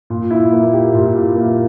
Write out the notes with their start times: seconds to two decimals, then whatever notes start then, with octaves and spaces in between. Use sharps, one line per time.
0.10 A#2
0.31 E4
0.52 A#3
0.73 G4
0.94 A#2
1.14 E4
1.35 A#3